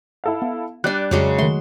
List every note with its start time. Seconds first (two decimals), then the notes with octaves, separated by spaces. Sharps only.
0.24 E4 A4 F5
0.42 B3
0.84 G3 D4 D5 F#6
1.11 F2 C#3 F#3 G#3
1.38 D#3 A3 C6